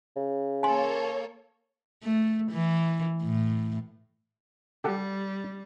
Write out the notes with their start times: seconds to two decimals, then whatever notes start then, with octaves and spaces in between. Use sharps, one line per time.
0.16 C#3
0.63 A#3 A4 C#5 G#5 C6
2.03 A3
2.52 E3
3.22 A2
4.84 G3 G4 A4 F#5